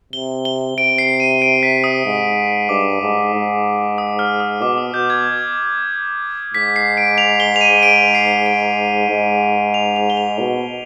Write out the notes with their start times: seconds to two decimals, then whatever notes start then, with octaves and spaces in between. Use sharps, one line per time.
0.13 C3 G7
0.45 G7
0.78 C3 D7
0.98 C7
1.20 D#7
1.42 D7
1.63 B6
1.84 D#6
2.06 G#2
2.69 G2 D6
3.01 G#2
3.34 G#2
3.98 D#6
4.19 F6
4.40 D#6
4.61 B2 D6
4.78 D#6
4.94 B2 G6
5.10 G#6
6.54 G#2 B6
6.76 C7
6.97 D7
7.18 F7
7.40 G7
7.56 F7
7.61 D#7
7.83 D7
8.15 C7
8.46 D7
9.10 G#2
9.74 F7
9.96 F7
10.10 G7
10.17 F7
10.39 B2